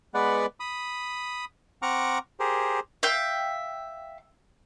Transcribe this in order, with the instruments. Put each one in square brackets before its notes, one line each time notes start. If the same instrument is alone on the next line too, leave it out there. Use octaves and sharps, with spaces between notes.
[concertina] G#3 B3 B4 D5 F#5
B5 D#6
C4 F#5 A#5 C#6 D6 F6
G4 G#4 A#4 C5
[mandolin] E5 F5 G5